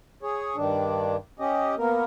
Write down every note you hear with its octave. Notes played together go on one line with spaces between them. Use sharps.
G#4 C#5
G2 D#3 D4
C#4 G4 D#5
A#3 B3 A#4